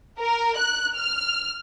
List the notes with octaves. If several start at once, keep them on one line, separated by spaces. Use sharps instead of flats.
A#4
F#6
F6